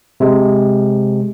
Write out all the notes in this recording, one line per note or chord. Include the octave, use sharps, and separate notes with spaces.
C3 G#3